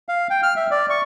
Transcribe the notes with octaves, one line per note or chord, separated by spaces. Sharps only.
F5
G5
F6
E5
D5
C#6